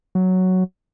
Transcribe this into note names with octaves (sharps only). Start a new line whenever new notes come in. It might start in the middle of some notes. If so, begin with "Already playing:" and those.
F#3